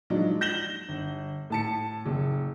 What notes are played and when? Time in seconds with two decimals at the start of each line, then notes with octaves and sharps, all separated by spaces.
0.10 F3 F#3 G#3 D4 D#4
0.41 G6 A#6 E7 F#7 G7
0.88 G1
1.50 A2 A5 C#7
2.06 F#1